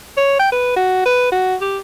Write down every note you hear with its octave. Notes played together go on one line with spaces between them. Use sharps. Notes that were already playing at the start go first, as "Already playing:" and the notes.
C#5
G5
B4
F#4
B4
F#4
G4